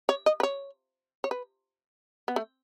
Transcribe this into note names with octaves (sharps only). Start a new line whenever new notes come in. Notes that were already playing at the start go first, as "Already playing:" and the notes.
C#5
D#5
B4
C#5
C#5
B4
B3
A3